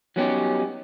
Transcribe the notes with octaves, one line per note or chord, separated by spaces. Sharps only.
F#3 G3 B3 C#4 D#4 G4